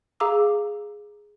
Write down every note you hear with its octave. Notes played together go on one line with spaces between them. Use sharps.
G#4 F5 A#5 D6 E6